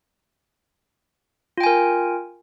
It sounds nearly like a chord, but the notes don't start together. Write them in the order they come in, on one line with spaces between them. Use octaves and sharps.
F4 G5 G#5 A#4